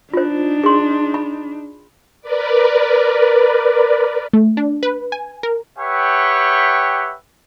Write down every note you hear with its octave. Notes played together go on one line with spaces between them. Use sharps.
D4 D#4 F4 C5
G#4 C6
B5
A#4 B4 D5
A3
D4
B4
G#5
A#4
G4 B4 C#5 E5 F#5 G5